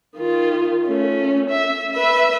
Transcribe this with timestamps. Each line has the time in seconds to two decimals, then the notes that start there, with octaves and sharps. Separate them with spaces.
0.17 D#3 F4
0.86 A3 C#4
1.50 E5
1.93 B4 E5